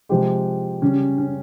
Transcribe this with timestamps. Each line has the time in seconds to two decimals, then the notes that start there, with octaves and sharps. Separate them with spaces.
0.09 C3 F3 G#3 G4
0.82 C#3 G3 C#4
1.18 C#4